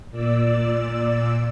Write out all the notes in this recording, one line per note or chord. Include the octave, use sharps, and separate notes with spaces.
A#2 D5 E6